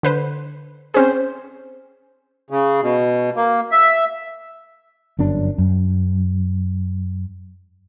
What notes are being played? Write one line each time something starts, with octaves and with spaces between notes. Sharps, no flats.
D3 B4 C5
C4 C#4 G#4 C5
C#3
B2
A#3
E5
G1 F#2 D4
F#2